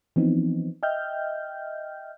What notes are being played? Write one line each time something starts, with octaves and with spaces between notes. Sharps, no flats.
E3 F3 B3 C4 D#4
D#5 E5 G5 F6 G6